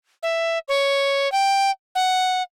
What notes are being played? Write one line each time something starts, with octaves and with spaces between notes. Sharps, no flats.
E5
C#5
G5
F#5